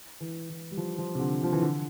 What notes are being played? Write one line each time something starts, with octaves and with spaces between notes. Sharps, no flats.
E3
E3
G3
F3
F3
C3
D3
F3
E3
D3